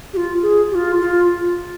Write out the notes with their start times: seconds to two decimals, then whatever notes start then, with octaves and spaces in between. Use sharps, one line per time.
0.13 G4
0.17 F4
0.42 G#4
0.71 G4
0.75 F4
1.01 F4